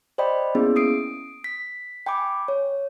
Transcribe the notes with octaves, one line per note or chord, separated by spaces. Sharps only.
C5 D5 D#5 G5 B5
A#3 B3 C#4 E4 G#4
D#6 C7 D7
B6
G5 G#5 B5 D6
C#5